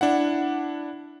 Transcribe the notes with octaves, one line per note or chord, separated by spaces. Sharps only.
D4 E4 F#5